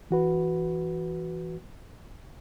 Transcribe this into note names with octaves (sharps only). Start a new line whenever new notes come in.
E3 F#4 B4